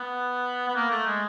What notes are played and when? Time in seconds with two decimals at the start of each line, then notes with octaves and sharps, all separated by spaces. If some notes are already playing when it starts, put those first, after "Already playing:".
Already playing: B3
0.68 B3
0.76 A#3
0.91 A3
1.06 G#3